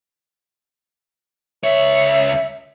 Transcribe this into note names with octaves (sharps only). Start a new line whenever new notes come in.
C#2 C#5 E5